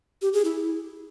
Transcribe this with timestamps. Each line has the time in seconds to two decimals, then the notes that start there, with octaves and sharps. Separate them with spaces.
0.22 G4
0.33 G#4
0.45 E4